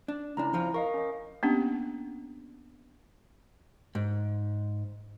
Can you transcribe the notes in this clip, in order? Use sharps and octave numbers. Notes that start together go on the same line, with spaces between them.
D4
C#2 C#4 D4 E4 A#5
F2 F3 F4
A#4 D#5 F5 C#6
C#4 D#5
A#3 B3 C#4 D4 G4
G#2